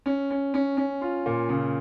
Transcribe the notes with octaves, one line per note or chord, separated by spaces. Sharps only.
C#4
C#4
C#4
C#4
F4
A#2
C#3